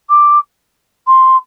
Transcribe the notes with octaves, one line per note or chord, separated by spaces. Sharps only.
D6
C6